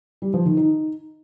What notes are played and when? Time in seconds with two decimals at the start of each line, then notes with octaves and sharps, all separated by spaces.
0.22 G3
0.34 F3
0.45 D#3
0.57 D#4